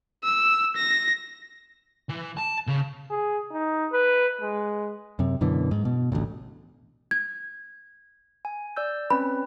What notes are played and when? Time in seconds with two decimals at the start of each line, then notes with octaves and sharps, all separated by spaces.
0.24 E6
0.76 A#6
2.09 E3
2.37 A5
2.67 C#3
3.10 G#4
3.52 D#4
3.92 B4
4.41 G#3
5.19 F#2 C3
5.41 F#2 B2 D3 E3
5.71 G#2
5.85 B2
6.12 A1 D2 A#2
7.11 G#6
8.45 G#5
8.76 D5 E6 G6
9.10 C4 C#4 B4 B5